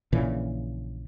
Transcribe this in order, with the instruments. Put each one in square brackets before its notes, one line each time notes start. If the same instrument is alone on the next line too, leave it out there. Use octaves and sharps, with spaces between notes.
[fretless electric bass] A#1 A#2 C#3 E3